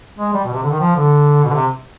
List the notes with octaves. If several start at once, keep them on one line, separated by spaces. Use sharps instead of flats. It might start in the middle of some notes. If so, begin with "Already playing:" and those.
G#3
G3
B2
C3
D3
D#3
F3
D3
B2
D3
C3